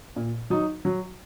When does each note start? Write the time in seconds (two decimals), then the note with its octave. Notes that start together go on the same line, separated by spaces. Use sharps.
0.16 A#2
0.50 F#3 D#4
0.85 F#3